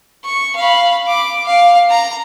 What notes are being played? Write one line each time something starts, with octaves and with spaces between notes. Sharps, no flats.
C#6
F5 B5
D6
F5
A#5